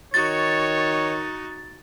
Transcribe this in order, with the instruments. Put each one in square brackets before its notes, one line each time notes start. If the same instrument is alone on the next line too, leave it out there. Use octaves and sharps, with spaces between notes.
[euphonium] D#3 [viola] D#4 F#4 [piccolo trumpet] C#5 [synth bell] A6